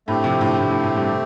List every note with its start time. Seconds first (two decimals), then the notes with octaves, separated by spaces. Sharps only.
0.07 A2 D3 A3 C4 G4
0.24 C3 F3
0.41 A2 D3
0.58 A2 D3
0.70 A2 D3
0.83 A2
0.96 G2 C3
1.08 C3